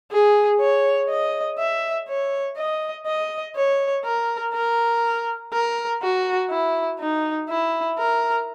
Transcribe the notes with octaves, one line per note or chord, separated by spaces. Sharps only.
G#4
C#5
D#5
E5
C#5
D#5
D#5
C#5
A#4
A#4
A#4
F#4
E4
D#4
E4
A#4